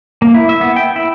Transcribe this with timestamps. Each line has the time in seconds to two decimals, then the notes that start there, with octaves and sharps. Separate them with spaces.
0.22 A#3
0.34 E4
0.49 E5
0.61 B3
0.76 G5
0.96 E4